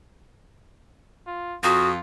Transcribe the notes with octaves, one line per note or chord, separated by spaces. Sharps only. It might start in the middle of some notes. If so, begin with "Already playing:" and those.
F4
F2 F4 F#4 D#6